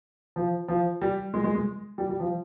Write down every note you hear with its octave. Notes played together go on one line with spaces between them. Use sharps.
F3
F3
G3
G#3
G#3
G#3
G3
G3
F3